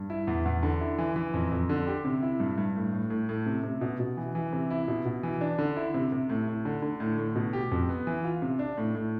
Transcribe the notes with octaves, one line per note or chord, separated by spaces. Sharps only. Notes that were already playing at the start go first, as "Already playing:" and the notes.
Already playing: G2
E4
E2
E2
D3
E4
E3
E3
F2
F2
D3
G4
C3
E4
G2
G2
A2
A2
A2
A2
C3
C3
B2
B2
E3
E3
C3
E4
B2
B2
E3
D4
D3
E4
C3
C3
A2
A2
D3
D3
A2
A2
B2
G4
F2
B3
E3
F4
C3
D4
A2
A2